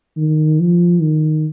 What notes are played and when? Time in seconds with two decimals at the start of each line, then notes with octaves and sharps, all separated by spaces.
0.17 D#3
0.60 F3
1.01 D#3